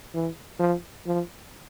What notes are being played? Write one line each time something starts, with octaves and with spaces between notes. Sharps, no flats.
E3
F3
F3